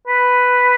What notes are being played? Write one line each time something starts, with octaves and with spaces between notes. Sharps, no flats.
B4